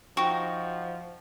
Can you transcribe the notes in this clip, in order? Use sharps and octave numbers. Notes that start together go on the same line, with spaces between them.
F3 D#4 F#4 G5 C#6